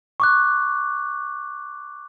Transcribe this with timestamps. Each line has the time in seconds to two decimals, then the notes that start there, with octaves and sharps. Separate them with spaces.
0.20 C#6 D6 F#6